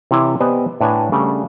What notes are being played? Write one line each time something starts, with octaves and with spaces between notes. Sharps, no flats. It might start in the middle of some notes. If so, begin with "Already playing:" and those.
C3 E3 E4 C#5
B3 G4 C5 D5 D#5 G#5
A2 D4 B4 C#5 G#5 A5
C#3 G3 A3 D4